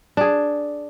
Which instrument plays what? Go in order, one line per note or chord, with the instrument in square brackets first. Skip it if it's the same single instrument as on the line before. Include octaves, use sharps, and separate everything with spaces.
[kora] D4 G#4